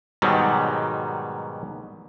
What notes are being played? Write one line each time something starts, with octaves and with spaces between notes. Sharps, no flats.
G#2 B2 D#3 F#3 G3